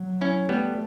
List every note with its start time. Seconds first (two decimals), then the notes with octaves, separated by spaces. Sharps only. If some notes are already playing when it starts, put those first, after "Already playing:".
Already playing: F#3
0.21 C#4 E4
0.49 G3 A3 B3